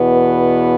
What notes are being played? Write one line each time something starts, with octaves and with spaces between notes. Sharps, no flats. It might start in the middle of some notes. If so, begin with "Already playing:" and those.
Already playing: E2 B2 B3
B4